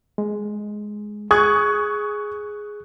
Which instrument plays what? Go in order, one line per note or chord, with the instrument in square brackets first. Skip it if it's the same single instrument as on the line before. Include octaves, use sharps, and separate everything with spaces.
[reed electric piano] G#3
[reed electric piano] G#4 F#6 [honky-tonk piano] C#6 D#6 G#6